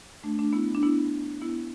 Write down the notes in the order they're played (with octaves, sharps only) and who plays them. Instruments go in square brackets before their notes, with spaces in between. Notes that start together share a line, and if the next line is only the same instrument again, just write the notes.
[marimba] A3 D4
A3 D4
B3 E4
D4
B3 E4
B3 E4